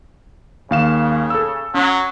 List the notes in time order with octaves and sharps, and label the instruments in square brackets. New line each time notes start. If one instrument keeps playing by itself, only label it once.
[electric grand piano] D#2 F5 E7 [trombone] C#3
[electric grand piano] A4 E6
[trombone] F#3 [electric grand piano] C#4